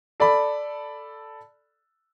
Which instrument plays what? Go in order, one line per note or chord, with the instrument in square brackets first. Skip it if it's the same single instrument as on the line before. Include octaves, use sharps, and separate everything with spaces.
[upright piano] A4 D5 A5 B5